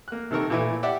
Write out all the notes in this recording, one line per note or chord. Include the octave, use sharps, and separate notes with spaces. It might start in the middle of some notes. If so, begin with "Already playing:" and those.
A#3 F#6
C3 D#3 A4 A#4 C#6
A#2 E3 A3
G4 D5 E5 F#5